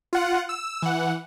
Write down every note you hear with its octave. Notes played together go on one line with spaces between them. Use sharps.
F4 F#5
E6
E3 F#5